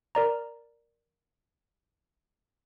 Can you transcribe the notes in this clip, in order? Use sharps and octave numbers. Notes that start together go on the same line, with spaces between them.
A#4 D5 A#5